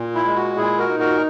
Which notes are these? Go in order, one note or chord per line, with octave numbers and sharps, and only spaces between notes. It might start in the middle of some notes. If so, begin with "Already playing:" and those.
Already playing: A#2
E4
G#3
F#4
A#2 E4 G#4
F#4 A#4
D#4
F#4 A#4